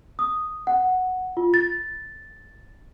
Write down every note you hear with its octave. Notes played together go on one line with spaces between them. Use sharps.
D#6
F#5
F4
A6